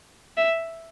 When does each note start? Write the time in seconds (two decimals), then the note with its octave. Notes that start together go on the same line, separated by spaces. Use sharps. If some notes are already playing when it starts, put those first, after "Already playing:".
0.37 E5